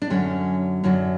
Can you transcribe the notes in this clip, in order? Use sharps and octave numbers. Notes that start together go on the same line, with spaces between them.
D4
F#2 D3 F#3 C#4
F#2 D3 F#3